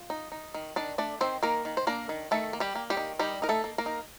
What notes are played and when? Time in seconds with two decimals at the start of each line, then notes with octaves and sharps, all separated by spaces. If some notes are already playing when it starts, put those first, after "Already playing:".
Already playing: F4
0.10 D#4
0.32 D#4
0.54 D#3
0.76 D#3 D4 D5
0.98 A3 D4 D5
1.21 D#3 C4 C5
1.43 D#3 A#3 A#4
1.65 D#3
1.77 C5
1.87 A#3 D4 A#4
2.09 D#3
2.31 D#3 A3 A4
2.53 A#3
2.60 G3 G4
2.75 A#3
2.90 G3 G4
2.97 D#3
3.19 G3 D#4 G4
3.42 D#4 A#4
3.49 A3 A4
3.64 A#3
3.78 A#3 A#4
3.86 D#4